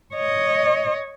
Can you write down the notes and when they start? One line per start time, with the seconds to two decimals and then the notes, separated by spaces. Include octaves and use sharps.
0.15 C#5 D#5